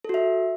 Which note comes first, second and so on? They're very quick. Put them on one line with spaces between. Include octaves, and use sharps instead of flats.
A4 F#4 E5